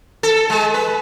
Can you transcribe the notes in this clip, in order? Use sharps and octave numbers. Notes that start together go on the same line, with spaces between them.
A4
G#3
B4